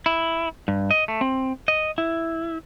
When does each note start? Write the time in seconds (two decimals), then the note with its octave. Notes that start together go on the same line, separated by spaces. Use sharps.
0.06 E4
0.68 G2
0.91 D#5
1.08 A3
1.21 C4
1.68 D#5
1.98 E4